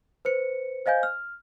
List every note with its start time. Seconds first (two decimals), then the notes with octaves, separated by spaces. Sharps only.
0.25 B4 C5 C#7
0.86 C5 D#5 F5 G#5 G6
1.03 F6